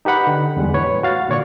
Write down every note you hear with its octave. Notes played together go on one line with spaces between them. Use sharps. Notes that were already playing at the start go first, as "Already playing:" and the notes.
D#4 G4 B4 F#5 B5
D3
E2 D3 G3 G#3
A2 B4 C#5
F#4 F5 A6
A#2 D3 C#5 D5 C#6